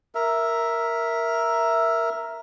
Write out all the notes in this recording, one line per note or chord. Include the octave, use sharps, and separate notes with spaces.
A#4 E5